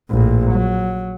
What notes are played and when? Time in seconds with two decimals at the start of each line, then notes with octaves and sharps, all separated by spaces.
0.10 A#1 A2
0.51 F#3